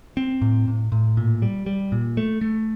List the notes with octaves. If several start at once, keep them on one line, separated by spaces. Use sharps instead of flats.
C4
A2
A2
A2
A#2
G3
G3
A#2
A3
A3